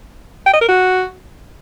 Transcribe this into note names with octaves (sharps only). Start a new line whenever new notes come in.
G5
D#5
A#4
F#4